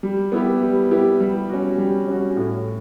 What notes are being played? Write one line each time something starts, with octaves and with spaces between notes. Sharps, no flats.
G3
B3 E4 G4
G3
B3 E4 G4
G3
C#4 F#4
G3
C#4 F#4
A2